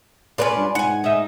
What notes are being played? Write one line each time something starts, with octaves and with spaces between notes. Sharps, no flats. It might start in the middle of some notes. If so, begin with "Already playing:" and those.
C#4 D4 F4 B4 D5
G2
G#2 F#5 G#5
D#4 E5